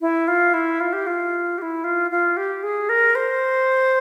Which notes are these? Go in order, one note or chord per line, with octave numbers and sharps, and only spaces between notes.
E4
F4
E4
F4
G4
F4
G4
E4
F4
F4
G4
G#4
A#4
C5